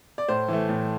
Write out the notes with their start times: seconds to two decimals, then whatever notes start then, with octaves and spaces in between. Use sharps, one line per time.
0.18 D5
0.28 A2 C5
0.48 E3 A3
0.69 A2